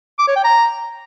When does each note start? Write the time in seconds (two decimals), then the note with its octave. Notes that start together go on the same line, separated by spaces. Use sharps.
0.19 D6
0.27 C#5
0.36 G5
0.44 A#5